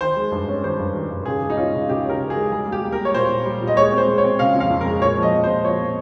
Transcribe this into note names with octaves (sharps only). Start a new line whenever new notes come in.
D#3 C5
G#3
G2
C#4
D#3 C5
G2
D#3
G2
C#3 G#4
G#3
D#4
C#4 F4
C#3
C#3 G4
C#4 A#4
C#3
G#4
G#3
G3 G#4
A#3
G4
A#3
A#4
G3
C#5
A#2 C5
A#2
G3
A#2
D#5
G#3 C#5
C4
C5
G#3
C#5
C4
C#3 F5
F2
F5
F2
A#4
G#3
A#2 C#5
F3
D#5
C4
C5
A#2
F3 C#5
C4